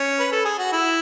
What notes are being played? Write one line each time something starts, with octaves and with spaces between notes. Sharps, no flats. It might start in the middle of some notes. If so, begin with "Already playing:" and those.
Already playing: C#4
B4
A4
G#4
F#4
E4